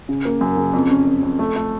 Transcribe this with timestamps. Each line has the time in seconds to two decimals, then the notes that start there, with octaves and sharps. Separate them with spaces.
0.09 C#3
0.25 A#3
0.41 F#2
0.57 C#3
0.73 F2
0.91 C#4
1.07 F2
1.22 F2
1.39 A3
1.56 A3